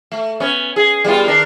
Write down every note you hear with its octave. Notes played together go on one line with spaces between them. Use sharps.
A3
B3 C#4
G#4
G3 B3 F4
D#3 D4 A#4